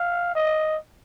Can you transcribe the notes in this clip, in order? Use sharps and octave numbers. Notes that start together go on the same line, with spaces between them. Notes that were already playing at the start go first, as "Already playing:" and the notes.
Already playing: F5
D#5